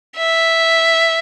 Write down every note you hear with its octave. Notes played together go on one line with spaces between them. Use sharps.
E5